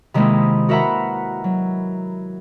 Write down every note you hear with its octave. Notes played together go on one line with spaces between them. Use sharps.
C3 D#3 G#3 A#3 D#4 E4
F#4 A#4 B4 E5 F#5 A#5
F#3